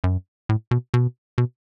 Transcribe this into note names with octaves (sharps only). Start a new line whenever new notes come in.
F#2
A2
B2
B2
B2